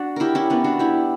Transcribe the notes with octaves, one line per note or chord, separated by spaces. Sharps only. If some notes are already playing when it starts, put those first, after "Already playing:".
Already playing: D4 F#4
E4 G4 A#4
C#4 E4
B3 D4
D4 F#4
E4 G4